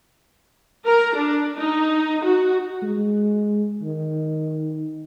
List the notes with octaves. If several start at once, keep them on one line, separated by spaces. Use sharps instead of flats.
A#4
D4
D#4
F#4
G#3
D#3